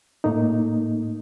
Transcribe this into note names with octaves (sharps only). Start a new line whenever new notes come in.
A2 A3 A#3 D#4